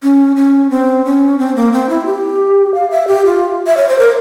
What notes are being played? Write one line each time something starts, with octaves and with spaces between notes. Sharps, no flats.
C#4
C#4
C4
C#4
C4
A#3
C4
E4
G4
F5
E5
G4
F4
E5
C#5
C5
A#4